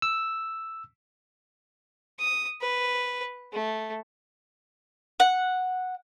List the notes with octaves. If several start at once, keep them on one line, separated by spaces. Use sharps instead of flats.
E6
D#6
B4
A3
F#5